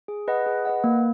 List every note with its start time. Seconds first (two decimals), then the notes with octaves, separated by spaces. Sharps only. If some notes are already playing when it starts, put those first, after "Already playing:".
0.08 G#4
0.28 B4 D#5 F#5
0.46 G#4
0.65 B4 D#5 F#5
0.84 A#3